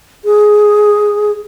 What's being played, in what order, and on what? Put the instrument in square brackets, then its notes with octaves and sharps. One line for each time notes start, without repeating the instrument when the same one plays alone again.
[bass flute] G#4